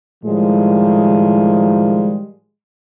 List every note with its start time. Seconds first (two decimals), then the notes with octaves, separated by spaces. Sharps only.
0.24 A2 D#3 F3 G3 G#3